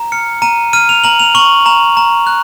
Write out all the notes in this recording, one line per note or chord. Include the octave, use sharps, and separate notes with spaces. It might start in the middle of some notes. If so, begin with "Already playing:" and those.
Already playing: A#5
F6 C#7
A#5 D#7
F6 D#7
F7
A#5 F#7
F7
C#6 F#7
A#5 F7
A#5
F#6